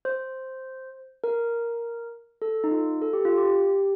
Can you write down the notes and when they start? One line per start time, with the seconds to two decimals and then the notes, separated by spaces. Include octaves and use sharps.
0.05 C5
1.24 A#4
2.42 A4
2.64 D#4
2.71 F4
3.02 A4
3.13 G4
3.25 F4
3.38 G4